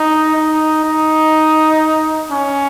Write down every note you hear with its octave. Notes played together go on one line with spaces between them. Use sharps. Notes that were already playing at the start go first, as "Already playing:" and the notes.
Already playing: D#4
D#4
D#4
C#4